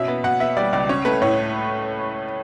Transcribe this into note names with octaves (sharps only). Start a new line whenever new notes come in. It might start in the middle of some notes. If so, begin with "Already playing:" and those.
Already playing: B2 C#4 E5
B3
B2 F#5
B3 E5
G3 D5
C#2 D5
C#4 C#5
A3 B4
A2 C#5